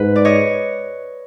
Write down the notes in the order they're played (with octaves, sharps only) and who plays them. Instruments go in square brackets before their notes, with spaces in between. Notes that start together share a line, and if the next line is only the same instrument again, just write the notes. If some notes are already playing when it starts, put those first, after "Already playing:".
Already playing: [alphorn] G#2 [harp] B4
[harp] D5
C#5 D#5